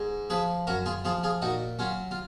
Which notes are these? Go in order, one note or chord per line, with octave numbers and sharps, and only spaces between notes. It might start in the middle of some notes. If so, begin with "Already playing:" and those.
Already playing: G#2
F3 G#4 B4
F#2 F#4 A#4
F4 G#4
F3 F4 G#4
F4 G#4
A#2 D#4 F#4
F#3 C#4 F4
F4